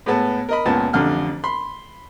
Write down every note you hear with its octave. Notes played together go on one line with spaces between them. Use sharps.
A2 G#3 B3 A5
A#4 D#5 B5
C#2 A#2 B3 A5
A1 F2 D3 F6
B5 C6